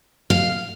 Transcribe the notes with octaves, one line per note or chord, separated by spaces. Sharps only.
F5